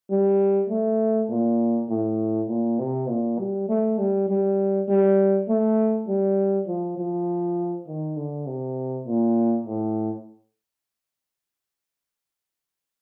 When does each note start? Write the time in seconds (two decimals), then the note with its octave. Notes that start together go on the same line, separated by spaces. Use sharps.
0.10 G3
0.70 A3
1.30 A#2
1.89 A2
2.49 A#2
2.79 C3
3.09 A#2
3.39 G3
3.69 A3
3.99 G3
4.29 G3
4.88 G3
5.48 A3
6.08 G3
6.67 F3
6.97 F3
7.87 D#3
8.17 D3
8.47 C3
9.06 A#2
9.66 A2